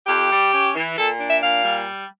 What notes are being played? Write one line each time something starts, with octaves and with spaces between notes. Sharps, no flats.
F2 G4
G3
C#4
E3
A#2 A4
D4
E5
A#2 F5
G3